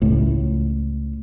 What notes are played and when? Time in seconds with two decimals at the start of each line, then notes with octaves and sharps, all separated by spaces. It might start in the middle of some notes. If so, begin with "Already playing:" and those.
0.02 C#2 A2